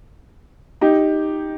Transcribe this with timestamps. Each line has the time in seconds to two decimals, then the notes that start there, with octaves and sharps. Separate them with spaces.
0.81 D#4 G4